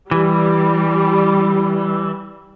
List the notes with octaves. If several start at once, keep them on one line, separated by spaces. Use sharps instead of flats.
E3 G3